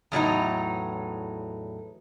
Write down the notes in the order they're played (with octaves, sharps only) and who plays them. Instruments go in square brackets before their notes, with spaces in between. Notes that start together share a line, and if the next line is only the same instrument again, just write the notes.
[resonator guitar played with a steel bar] E2 A2 F#3 D#4